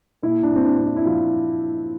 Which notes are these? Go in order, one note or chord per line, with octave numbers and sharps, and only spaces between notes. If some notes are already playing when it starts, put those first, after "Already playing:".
A#2 E4
D4
A#2
C4
D4
C4
E4
E4
F3 F4